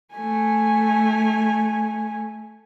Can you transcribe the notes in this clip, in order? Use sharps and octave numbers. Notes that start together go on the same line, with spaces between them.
A3 G#5